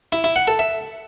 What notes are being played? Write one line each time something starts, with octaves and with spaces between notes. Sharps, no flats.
E4
E4
F#5
A4
E5